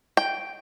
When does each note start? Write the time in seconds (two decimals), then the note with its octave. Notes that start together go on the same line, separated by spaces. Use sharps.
0.17 G5